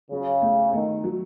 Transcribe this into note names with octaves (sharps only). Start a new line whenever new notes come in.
C#3 F#3
A3
D#3 A3
F#3